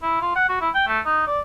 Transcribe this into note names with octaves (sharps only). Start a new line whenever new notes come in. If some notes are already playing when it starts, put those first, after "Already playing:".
E4
F4
F#5
F#4
E4
G5
A3
D#4
D5